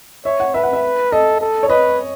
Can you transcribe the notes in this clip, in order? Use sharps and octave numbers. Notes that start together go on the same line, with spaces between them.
C#5 E5
F#5
B4 E5
F#5
E5
A4 D#5
A4
C#5
B4 D#5